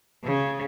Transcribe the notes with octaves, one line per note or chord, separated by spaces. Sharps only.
C#3